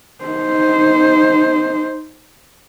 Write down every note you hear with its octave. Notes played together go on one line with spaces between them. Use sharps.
D#4 C5